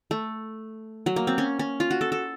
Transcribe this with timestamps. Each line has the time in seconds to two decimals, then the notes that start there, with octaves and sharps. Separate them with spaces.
0.11 A3
1.06 F#3
1.16 A#3
1.27 C4
1.38 C#4
1.59 C#4
1.80 F4
1.91 F#4
2.01 A4
2.12 A4